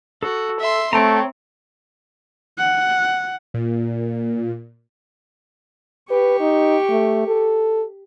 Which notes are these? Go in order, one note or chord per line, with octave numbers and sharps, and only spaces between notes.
F#4 A4
E5 C6
A3 C4 C#5 G5 A#5
F#5
A#2
G4 B4 C#6
D#4
A3
A4